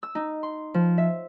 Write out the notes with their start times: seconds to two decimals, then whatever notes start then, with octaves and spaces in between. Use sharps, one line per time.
0.03 E6
0.15 D#4
0.43 C6
0.74 F3
0.98 E5